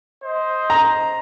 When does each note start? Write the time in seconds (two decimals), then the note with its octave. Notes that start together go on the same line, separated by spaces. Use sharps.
0.24 C5 D#5
0.70 A#5